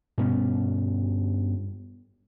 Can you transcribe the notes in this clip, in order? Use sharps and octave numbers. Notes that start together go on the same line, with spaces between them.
G2 B2 B3 C#4